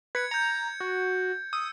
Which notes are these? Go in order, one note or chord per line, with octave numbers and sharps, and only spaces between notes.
B4 G#6 C#7
A#5 G6 C#7
F#4
D#6 E6